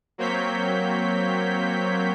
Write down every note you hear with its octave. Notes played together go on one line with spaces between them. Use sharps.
F#3 A#3 C4 C#5 G6 B6